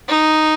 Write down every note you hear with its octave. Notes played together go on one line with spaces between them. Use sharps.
D#4